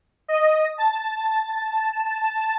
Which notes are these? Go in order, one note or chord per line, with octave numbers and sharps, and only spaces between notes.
D#5
A5